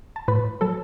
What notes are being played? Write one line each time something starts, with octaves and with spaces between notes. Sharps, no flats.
A5
A2 B4 B5
F#3 A4 A5